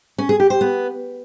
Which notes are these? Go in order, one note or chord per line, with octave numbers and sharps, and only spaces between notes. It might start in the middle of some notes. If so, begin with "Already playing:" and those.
C#4
G#4
G4
C5
B3